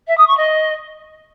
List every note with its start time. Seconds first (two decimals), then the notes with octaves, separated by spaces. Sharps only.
0.07 E5
0.17 D#6
0.27 C#6
0.37 D#5